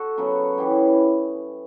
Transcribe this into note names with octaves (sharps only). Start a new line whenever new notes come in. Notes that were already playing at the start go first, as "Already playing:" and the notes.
Already playing: F#4 A4
C#3 F#3 B3
C#3 E3 B3 E4 G4